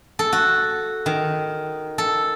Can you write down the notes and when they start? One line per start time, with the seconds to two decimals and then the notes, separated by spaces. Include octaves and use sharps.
0.19 A4
0.33 F#4
1.06 D#3
1.98 A4